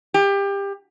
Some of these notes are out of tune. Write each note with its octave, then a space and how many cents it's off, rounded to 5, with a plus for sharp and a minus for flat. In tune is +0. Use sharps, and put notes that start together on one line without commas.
G4 +25